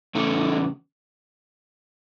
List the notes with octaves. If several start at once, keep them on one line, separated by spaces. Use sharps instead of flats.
E2 C#3 A3